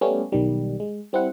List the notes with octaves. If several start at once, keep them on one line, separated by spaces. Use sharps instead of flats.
G3 A3 B3 C#4 G4
B1 D#3 G3
G#3
G3 C4 E4 F#5